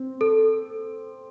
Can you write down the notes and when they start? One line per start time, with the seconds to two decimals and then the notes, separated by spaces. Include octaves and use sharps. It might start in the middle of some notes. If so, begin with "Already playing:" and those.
Already playing: C4
0.21 A4